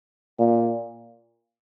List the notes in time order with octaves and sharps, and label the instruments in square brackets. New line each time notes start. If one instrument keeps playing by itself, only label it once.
[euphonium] A#2